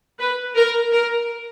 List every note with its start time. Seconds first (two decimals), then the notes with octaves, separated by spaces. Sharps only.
0.19 B4
0.55 A#4
0.92 A#4